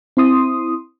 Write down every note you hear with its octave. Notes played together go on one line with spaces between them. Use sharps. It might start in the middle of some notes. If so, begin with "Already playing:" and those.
C4 E4 C6 D#6